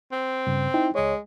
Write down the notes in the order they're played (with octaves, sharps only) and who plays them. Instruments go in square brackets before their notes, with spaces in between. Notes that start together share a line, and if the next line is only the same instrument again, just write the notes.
[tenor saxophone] C4
[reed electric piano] G2 C#3
D#4 E4 G5
[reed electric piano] C#2 C#5 [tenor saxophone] G#3